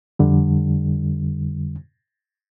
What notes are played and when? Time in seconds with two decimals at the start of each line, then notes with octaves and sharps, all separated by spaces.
0.19 F2 D3 G3